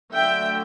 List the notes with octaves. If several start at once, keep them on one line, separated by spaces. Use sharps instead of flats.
D3 F#3 A3 D4 E5 G5